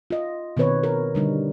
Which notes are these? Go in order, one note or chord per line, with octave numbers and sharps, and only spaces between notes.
F4 D#5
B2 D#3 C4 B4 C#5
A#4
D3 G3 D#4